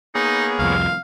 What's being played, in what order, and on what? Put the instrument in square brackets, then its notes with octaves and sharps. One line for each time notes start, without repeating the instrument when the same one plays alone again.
[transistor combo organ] A#3 B3 C#5 [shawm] D#4 [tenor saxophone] G#4
[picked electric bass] C2 F2 [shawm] F5